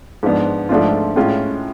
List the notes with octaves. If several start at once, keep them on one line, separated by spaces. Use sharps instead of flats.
G#2 F3 B3 D4
G#2 F3 A3 D4 F4
A2 G#3 C#4 F4